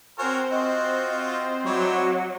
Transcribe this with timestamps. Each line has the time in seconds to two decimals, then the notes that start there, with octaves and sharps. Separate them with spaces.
0.19 C4 F#4 A#4 C5 C#5 G#5
0.51 F4 F#4 D#5
1.66 F#3 E4 C#5 D5